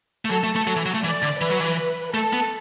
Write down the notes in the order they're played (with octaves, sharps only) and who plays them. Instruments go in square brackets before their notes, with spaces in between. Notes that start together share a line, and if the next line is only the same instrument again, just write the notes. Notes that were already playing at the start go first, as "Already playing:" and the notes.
[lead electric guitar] A3
[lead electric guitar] F#3 [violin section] A4
[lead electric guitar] A3
A3
F#3
E3
F#3
A3
[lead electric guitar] E3 [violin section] D5
[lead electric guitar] D3
[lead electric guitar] E3 [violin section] B4
[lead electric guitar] F#3
E3
[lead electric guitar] A3 [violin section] A4
[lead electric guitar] B3